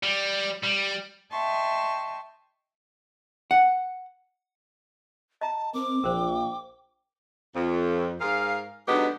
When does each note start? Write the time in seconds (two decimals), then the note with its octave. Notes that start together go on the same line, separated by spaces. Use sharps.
0.03 G3
0.64 G3
1.31 D#5 E5 G5 A5 C6 C#6
3.51 F#5
5.41 D#5 A5 A#5
5.74 C4 A#4 D6
6.04 A#1 A#4 C5 G5
7.56 F2
8.21 G#2 G#4 A#4 F5
8.88 D3 F#3 G#3 B3 D#4 G4